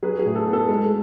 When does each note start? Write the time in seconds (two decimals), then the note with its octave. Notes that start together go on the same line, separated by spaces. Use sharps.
0.03 F#3 G#4 B4
0.19 G#4
0.25 A2
0.36 A4
0.48 B3
0.53 A4
0.69 G#3